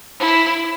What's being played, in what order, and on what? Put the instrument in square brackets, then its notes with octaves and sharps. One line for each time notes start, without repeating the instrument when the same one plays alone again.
[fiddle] E4